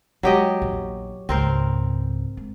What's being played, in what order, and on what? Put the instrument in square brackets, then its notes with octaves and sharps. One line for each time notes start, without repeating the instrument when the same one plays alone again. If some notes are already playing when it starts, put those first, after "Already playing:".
[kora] F#3 G4 D#5 [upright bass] G#3
[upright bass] A#1 E2
[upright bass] C#2 G#2 [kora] C4 A#4 C5
[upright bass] G#2